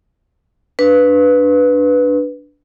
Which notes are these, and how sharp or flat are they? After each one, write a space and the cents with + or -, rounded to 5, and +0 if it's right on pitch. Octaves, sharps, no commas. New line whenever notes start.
D4 +0 B4 +0